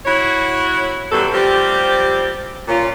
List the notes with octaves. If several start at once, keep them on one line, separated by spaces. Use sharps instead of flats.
E4 F#4 C#5
F#2 B2 E3 F#3 G3 A4
F3 G3 C4 G4
A#2 C#4 F4